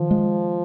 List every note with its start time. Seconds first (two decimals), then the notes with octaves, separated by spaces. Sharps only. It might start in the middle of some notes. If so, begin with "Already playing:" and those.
Already playing: D#3 F3
0.11 G#3